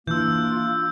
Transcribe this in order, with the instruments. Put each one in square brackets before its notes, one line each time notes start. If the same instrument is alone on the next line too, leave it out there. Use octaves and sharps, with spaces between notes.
[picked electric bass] E3 [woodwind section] A#3 D4 [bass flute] F4 [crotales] E6 G6